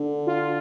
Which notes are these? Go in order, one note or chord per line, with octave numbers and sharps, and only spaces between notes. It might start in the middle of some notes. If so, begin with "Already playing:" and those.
Already playing: D3
F4